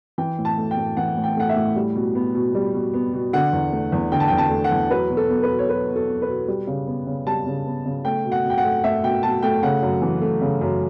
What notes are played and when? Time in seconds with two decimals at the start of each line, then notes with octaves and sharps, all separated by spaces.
0.18 E3 G5
0.38 A2
0.45 A5
0.58 A3
0.71 G5
0.77 A2
0.97 E3 F#5
1.17 A2
1.24 G5
1.37 A3 F#5
1.49 E5
1.56 A2
1.76 G3
1.95 B2
2.15 B3
2.35 B2
2.55 G3
2.74 B2
2.94 B3
3.14 B2
3.33 D3 F#5
3.53 E2
3.72 A3
3.92 E2
4.12 D3 G5
4.20 A5
4.28 G5
4.32 E2
4.38 A5
4.51 A3
4.64 F#5
4.71 E2
4.90 F#3 B4
5.10 B2
5.17 A4
5.30 B3
5.43 B4
5.50 B2
5.59 C#5
5.69 F#3 B4
5.89 B2
5.96 A4
6.09 B3
6.22 B4
6.28 B2
6.48 G3
6.67 C#3
6.87 B3
7.07 C#3
7.27 G3 A5
7.47 C#3
7.66 B3
7.85 C#3
8.05 A3 G5
8.25 B2
8.32 F#5
8.45 B2
8.50 G5
8.58 F#5
8.64 A3
8.84 A3 E5
9.03 B2 G5
9.23 B2 A5
9.43 A3 G5
9.63 C#3 F#5
9.82 F#2
10.02 E3
10.21 A3
10.41 C#3
10.61 F#2